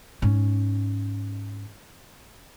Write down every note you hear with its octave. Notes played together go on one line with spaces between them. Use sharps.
G#2 C#4